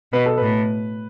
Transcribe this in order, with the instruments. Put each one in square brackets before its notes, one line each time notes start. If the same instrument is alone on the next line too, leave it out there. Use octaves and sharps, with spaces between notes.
[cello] B2 [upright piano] B4
[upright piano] A4
[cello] A2 [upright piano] B4